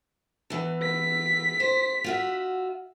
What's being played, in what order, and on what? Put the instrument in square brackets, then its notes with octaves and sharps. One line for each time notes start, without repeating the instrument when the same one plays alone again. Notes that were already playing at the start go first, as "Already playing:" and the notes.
[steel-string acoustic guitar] E2 E3
[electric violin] B6
[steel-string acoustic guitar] C5
F4 F#4 E5